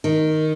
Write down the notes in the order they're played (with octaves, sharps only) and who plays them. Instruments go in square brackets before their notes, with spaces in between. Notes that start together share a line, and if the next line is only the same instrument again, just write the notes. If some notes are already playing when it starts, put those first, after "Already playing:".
[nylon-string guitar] D#3